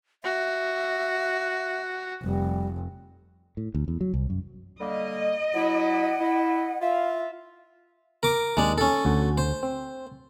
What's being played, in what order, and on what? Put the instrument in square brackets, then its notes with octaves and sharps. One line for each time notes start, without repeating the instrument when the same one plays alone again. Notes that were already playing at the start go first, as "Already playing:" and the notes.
[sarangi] F#4 [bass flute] E5
[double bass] F1 [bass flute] G3
[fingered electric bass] A2
D2
E2
F#3
C2
F#2
[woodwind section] D3 G3 A#3 [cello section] D#5
[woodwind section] F#3 E4 [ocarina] F#5
[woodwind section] E4
[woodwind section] F4 E5 [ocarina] F5
[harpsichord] A#4 D6
[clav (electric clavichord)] D#2 [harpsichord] G#3 D4
[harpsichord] C#4 A4
[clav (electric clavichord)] D2 F#4
[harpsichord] C5
[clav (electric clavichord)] C4